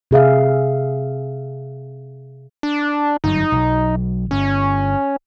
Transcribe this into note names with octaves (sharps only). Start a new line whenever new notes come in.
C3 G#4 E5 F5
D4
G1 F#2 F#3 D#4
B1 F#3
G1 C#4